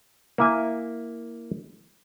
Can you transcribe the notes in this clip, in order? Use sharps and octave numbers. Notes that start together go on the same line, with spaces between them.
A#3 E4 G#5